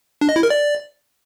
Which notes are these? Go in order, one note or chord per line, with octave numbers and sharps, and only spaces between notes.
D4
D#5
E4
A#4
D5